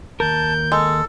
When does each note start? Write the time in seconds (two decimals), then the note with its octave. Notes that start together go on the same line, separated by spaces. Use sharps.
0.20 D#2 A#4 A5 G6
0.72 G#3 A4